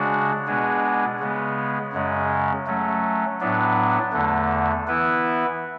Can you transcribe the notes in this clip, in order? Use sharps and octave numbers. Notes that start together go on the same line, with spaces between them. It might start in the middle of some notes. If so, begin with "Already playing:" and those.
Already playing: C#3 G#3 D4 F#4
B2 G#3 B3 D4 G#4
C#3 G#3 B3
F#2 C#3 G#3 C#4
F#3 A3 C#4
A2 F#3 B3 D4
E2 D3 A3
E3 B3 E4 B4